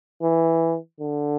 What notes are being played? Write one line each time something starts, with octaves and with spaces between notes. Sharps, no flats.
E3
D3